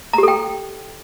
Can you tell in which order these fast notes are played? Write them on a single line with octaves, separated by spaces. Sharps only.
A#5 G4 A4 G5